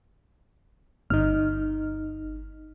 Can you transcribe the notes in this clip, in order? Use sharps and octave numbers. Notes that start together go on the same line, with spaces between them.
G1 D#4 F6